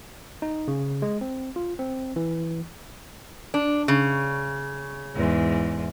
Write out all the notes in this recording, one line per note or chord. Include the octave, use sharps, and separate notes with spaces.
D#4
C#3
G#3
C4
F4
C4
E3
D4
C#3
E2 G#2